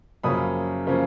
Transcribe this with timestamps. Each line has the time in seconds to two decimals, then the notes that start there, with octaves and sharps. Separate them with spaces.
0.23 F#2 C#3 F3 A#3 C#4 B5 D#6
0.87 C#3 F3 A#3 C#4